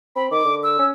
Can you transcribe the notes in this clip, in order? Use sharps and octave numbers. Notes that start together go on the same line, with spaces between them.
C4 B5
D#3 D6
D3
E6
C#4